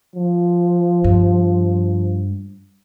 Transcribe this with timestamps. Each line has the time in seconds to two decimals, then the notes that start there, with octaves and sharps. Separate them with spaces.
0.16 F3
1.04 G2